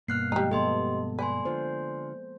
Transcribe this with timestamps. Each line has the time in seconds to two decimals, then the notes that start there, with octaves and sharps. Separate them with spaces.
0.08 G2 B2 A#3 F6 F#6 C7
0.32 F3 G3 G#3 D#4
0.51 B3 G4 A4 D#5 C6
1.19 B4 D5 G#5 C6
1.45 D3 F4 C5